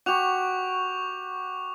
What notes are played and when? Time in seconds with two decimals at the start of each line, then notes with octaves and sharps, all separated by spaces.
0.06 F#4 G4 C#6 F7